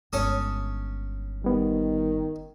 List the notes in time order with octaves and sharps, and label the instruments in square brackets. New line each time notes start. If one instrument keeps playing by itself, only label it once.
[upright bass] G1 G#3 [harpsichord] C#4 A4 D#6
[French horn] D#3 [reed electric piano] G3 B3